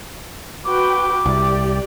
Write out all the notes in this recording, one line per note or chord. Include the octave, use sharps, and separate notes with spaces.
F#4 B4 G5 D6
C2 G4 D5